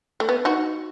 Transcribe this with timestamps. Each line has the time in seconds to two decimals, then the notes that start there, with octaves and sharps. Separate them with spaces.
0.20 A3
0.29 B3
0.45 D#4 F#4